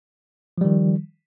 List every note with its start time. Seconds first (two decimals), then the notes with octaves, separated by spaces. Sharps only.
0.58 F3
0.61 G3
0.65 D#3